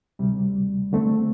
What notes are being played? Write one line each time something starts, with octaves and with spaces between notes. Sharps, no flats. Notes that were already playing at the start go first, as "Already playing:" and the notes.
D2 C3 G3
D#2 D3 A3 C4